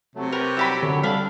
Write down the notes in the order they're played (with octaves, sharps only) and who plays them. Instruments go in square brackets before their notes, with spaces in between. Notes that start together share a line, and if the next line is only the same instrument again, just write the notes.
[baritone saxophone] C3 [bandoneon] F#3 A3
[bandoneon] G4 B4 C#5 [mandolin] A#4
[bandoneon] F#3 G3 E6 [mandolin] E4 G4 B5
[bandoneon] F#2 F#3 C#5 [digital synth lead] D3
[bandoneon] D3 A4 [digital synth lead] G3 [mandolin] D4 F5 B5